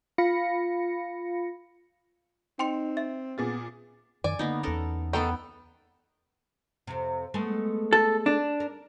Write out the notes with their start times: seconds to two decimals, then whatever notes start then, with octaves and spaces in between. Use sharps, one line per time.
0.18 F4 F5 B5 A#6 C#7
2.59 C4 D#4 G5 C6 C#7
2.97 E5
3.38 A#2 B3 G#4 A6
4.24 F#2 D#3 D5 G#5
4.39 D3 A#3 B3 D#4
4.63 E2 B3 C#4 A4 A#4
5.13 D#3 B3 A4 G5
6.87 F2 C3
7.34 G#3 A3 B3
7.93 A4
8.26 D4
8.60 A#4